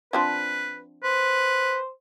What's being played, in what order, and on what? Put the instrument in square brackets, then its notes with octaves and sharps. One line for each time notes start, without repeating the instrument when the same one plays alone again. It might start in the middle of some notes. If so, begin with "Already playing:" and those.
[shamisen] F3 C4 D4 [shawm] B4
[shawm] B4 [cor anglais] C5